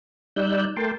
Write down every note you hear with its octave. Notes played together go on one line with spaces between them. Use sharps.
G3 D#4 D5 E6 F#6 G6
A3 A#4 G5 A5 C6 D6